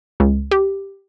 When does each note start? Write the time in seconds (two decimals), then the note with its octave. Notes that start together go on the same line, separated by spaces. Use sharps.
0.20 C#2
0.51 G4